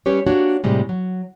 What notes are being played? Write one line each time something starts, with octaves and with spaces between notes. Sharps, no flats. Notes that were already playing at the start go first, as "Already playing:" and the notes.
G3 C#4 G4 B4 C#5
A#3 D4 F#4 G4 C#5
A2 C3 G3 G#3
F#3